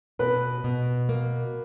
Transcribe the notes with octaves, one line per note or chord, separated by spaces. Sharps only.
B2 B4
B2
A#3